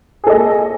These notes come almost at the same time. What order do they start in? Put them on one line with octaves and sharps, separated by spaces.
G#4 A4 D#5 A#3